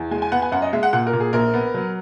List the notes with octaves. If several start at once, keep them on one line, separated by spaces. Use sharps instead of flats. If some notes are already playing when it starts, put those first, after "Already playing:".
Already playing: E2
G#3 G#5
G#5
B3 F#5
G#5
F#2 F#5
D#5
G#3 E5
F#5
A#2 F#5
A#4
A#2
G#4
A#1 A#4
B3
F#3